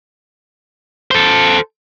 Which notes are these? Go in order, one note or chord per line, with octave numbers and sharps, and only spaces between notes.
A4 C5